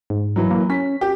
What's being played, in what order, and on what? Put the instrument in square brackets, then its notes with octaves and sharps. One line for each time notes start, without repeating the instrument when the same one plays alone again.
[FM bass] G#2
[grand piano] E3 F#3
[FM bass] A#3
[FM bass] C#4 [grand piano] B6
[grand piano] G4